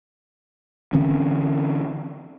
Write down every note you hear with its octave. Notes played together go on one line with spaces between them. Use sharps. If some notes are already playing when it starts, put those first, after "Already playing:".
D3 E3 C4 C#4